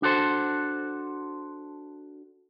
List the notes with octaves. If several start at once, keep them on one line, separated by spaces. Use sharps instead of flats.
D4 F#4 A4 C5